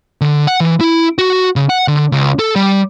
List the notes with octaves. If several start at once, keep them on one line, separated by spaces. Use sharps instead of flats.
D3
F#5
E3
E4
F#4
C#3
F#5
D3
C#2
A4
G3